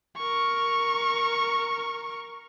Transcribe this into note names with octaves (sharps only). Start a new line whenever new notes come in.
A#4 C#6